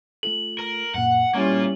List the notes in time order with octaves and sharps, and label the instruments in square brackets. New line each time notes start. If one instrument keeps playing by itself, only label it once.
[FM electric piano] A3 F4 A4 [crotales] F#7
[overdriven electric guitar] A#4
[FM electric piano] F#2 A#2 [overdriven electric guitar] F#5
[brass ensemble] G3 C#4 [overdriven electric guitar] A#3 F4 [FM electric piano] E4 E5 C#6